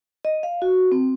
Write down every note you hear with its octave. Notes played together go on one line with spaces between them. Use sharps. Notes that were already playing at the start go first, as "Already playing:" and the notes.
D#5
F5
F#4
C4